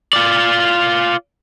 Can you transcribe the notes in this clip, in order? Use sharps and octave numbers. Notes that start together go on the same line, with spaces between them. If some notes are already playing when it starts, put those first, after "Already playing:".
F4 D5